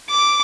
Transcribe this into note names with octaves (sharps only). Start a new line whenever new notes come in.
D6